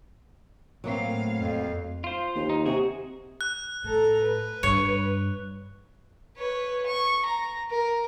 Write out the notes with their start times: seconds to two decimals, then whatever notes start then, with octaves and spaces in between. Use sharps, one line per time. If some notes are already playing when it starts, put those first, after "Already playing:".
0.84 A2 F#3 A#3 C4 F5
1.40 F2
2.04 F4 C5
2.36 D#2
2.50 D#4
2.66 C3 F#4 G#4
3.41 F#6
3.84 A2 A4 A#5
4.22 B4
4.63 G2 C#5
6.37 B4 C#5
6.86 C#6
7.26 A#5
7.71 A#4